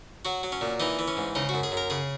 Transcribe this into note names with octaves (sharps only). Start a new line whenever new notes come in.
F#3 F#4
F#3
C#4
A#2
E3 D#4
E3
C#4
G#2
C#3 D#4
F#4
F#2
G#4
F#2 A#4
C#3 G#4